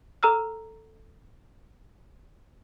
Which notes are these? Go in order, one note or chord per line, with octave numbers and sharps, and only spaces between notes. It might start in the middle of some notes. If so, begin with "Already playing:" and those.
A4 A#5 E6 F6